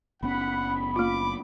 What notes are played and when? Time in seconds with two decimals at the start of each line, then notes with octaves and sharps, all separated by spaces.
0.23 F#1 B3 C#4 F#5 B5
0.96 A#3 F4 D6